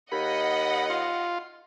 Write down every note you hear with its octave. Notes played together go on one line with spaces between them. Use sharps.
D#2 D#5 F#5 B5
F4